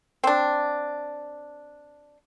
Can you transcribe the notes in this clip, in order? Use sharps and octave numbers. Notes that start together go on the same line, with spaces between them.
C4 D4